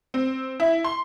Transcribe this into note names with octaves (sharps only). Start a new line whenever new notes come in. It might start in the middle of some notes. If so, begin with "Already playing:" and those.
C4
E4
C6